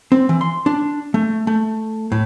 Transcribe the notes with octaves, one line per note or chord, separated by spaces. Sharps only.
C4
E3
C6
D4
A3
A3
A2